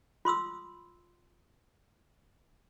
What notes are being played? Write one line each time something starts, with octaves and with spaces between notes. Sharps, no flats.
F4 C6 D#6 E6